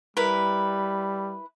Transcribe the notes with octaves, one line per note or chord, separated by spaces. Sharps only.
G3 E4 A#4 B4